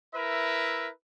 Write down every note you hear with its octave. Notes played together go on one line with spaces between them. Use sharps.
E4 A#4 B4 E5